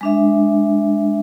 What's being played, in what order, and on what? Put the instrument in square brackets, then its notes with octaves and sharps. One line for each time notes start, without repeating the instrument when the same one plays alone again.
[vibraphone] G#3 D4 E5